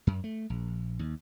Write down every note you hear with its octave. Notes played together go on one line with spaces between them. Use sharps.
F#2
A3
A#1
D#2